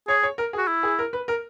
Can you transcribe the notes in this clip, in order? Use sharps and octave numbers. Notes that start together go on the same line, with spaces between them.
G#4 C#5
C#5
A#4
G#4
F#4
E4
G#4
A#4
B4
A#4